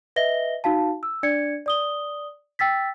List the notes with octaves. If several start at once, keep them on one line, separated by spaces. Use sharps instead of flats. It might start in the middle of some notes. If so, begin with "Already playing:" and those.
B4 D#5 E5 A#6 G7
D#4 F#4 F5 A5
E6
D4 D5 G#6 C#7
D5 D#6 G7
G5 E6 A6 B6